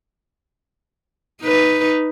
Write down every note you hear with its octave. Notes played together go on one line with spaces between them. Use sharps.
D#4 B4